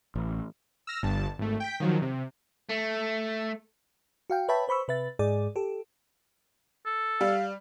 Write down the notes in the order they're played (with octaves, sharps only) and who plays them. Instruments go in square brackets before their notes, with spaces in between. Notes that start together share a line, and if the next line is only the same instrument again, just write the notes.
[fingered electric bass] A1
[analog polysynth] E6 F6 A#6
G1 G2 A5
G#1 A3
G5 B6
D#3 F3 F#3
C3
[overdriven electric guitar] A3
[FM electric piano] F#4 F5 G5
B4 C#5 E5 G5 A5 B5
B4 C5 B5 C#6 E6
C3 B4 E5 A6
G#2 G#4 D5
G4 A4
[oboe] A4
[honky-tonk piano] G3 [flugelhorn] F5